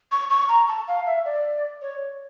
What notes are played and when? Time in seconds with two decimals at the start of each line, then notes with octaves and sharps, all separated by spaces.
0.12 C#6
0.30 C#6
0.49 A#5
0.68 A5
0.88 F5
1.06 E5
1.25 D5
1.82 C#5